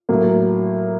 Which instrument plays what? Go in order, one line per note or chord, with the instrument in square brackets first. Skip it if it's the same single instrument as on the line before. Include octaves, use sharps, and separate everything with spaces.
[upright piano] A2 F#3 A#3